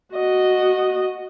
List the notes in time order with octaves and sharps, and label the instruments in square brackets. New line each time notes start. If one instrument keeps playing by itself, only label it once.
[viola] F#4 D#5